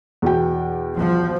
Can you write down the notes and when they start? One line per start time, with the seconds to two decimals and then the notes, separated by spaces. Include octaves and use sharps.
0.22 E2 B2 G5
0.96 F3